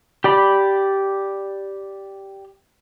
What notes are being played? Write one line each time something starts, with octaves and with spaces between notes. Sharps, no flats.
G4 D5 B5